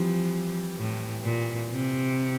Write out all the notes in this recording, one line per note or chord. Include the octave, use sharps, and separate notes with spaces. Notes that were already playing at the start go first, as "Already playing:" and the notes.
Already playing: E3 F3 G3 C4
A2
A#2
C3